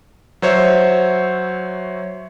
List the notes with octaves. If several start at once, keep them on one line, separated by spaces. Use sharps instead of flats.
F#3 C5 C#5 E5